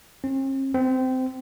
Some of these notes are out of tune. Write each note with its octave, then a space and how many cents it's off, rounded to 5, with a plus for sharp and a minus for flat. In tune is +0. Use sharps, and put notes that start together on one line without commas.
C4 +45
C4 -20